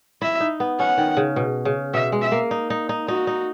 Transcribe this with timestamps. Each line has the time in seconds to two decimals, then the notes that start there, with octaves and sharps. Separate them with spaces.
0.22 E4 E5
0.40 D#4
0.60 B3
0.79 C#4 F#5
0.98 D#3
1.17 C#3
1.36 B2
1.65 C#3
1.94 B2 E5
2.12 G#3
2.22 E5
2.32 A#3
2.51 D#4
2.70 D#4
2.89 D#4
3.08 D#4 F#4
3.27 D#4